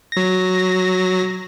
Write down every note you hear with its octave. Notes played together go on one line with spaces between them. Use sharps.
F#3 A#6